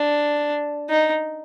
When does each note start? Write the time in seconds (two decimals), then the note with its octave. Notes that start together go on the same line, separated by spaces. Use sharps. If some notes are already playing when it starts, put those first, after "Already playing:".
Already playing: D4
0.89 D#4